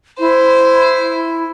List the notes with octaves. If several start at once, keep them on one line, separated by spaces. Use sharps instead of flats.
E4 C5